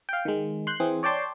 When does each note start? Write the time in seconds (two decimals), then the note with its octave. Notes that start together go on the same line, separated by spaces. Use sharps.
0.09 F5 G5
0.25 D#3 G#3
0.67 C6 F#6 G6
0.80 E3 C4 G#4
1.03 C#5 D5 G5 A5 C6 D6